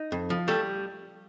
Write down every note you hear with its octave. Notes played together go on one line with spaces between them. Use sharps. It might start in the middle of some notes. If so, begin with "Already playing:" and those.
Already playing: D#4 D#5
F2
F3
G3 A3 A4